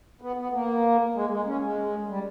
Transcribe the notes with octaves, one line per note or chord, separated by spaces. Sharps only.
B3
B3
A#3
G#3
G#3
C#4
G#3
G3